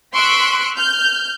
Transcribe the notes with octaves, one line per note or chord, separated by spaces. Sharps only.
C6 C#6 E6 F#6 B6 D7
F6 G6